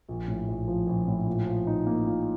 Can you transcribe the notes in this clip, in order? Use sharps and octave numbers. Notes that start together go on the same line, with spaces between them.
A#1
A2
A#1
F3
A#1
A2
A#2
F3
D#4
A#3
A#2